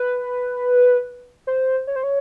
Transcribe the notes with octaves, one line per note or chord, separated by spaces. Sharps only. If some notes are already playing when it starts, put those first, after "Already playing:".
Already playing: B4
C5
C#5
C5
C#5